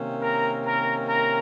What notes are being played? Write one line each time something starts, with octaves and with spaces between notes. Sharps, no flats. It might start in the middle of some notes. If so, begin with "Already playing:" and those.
Already playing: C3 D#3 A#3 C#4
A#4 A#5
A#4 A#5
A#4 A#5